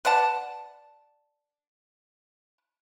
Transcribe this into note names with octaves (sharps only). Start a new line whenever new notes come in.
B4 D5 F#5 A5